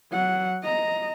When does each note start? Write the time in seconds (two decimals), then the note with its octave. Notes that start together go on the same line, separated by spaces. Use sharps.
0.12 F#3 F#5
0.63 D#5 A#5